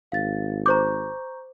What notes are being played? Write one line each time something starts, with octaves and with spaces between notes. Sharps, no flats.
G#1 F5 A6
C5 A#5 C#6 D6 G6